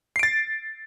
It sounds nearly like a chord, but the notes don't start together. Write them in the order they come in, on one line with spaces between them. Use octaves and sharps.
C7 D7 A6